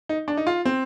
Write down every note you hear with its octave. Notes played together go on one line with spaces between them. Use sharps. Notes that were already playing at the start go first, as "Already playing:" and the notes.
D#4
D4
D#4
F4
C4